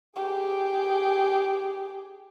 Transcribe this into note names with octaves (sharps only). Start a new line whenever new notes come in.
G4 G#4